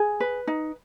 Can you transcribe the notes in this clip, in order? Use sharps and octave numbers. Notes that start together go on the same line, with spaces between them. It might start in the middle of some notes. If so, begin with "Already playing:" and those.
Already playing: G#4
B4
D#4